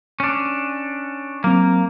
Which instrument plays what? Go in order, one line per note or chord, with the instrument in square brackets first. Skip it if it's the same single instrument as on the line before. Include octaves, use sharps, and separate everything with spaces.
[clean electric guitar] C#4 D4
[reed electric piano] F#3 C4 [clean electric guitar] A#3